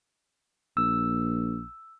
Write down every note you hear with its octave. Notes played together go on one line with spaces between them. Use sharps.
A#1 E6